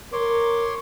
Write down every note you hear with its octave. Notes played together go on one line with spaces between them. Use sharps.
A#4 C#5 C6 D6